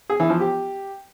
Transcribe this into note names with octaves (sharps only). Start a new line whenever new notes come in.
G#4
E3
F3
G4